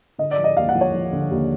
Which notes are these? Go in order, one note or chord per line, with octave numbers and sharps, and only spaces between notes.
D3 D#5
D5
F3
D#5
D#2 F5
F#5
F3
C#5
F3
D3
D#2